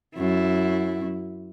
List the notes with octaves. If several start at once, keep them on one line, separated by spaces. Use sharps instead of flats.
F#2 E4